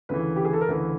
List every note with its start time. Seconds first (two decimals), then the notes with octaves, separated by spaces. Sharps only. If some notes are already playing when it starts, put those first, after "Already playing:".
0.09 D2 C#3 E3 B4
0.36 G4
0.45 G#4
0.53 A4
0.61 A#4
0.68 D2 C#3 E3 B4